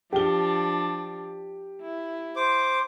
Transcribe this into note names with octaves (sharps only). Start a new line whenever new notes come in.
F3 D4 G4 G7
E4
C5 D6